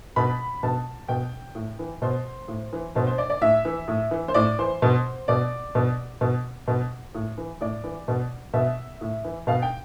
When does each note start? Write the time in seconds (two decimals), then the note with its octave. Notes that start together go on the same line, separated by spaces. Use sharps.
0.16 B2 B5
0.63 B2 A5
1.08 B2 G5
1.55 A2
1.79 E3
2.02 B2 C5
2.48 A2
2.73 E3
2.95 B2 C5
3.07 C5
3.18 D5
3.30 D5
3.41 A2 E5
3.65 E3
3.88 A2
4.11 E3
4.28 C5
4.34 A2 D5
4.59 E3 C5
4.82 B2
5.28 B2 D5
5.75 B2
6.21 B2
6.68 B2
7.15 A2
7.38 E3
7.61 A2 D5
7.84 E3
8.08 B2
8.53 B2 E5
9.01 A2
9.25 E3
9.47 B2 F5
9.62 G5